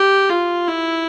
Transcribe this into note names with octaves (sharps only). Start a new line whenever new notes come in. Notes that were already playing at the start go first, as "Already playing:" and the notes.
Already playing: G4
F4
E4